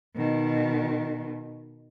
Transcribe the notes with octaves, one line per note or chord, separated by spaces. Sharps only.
B2 D#3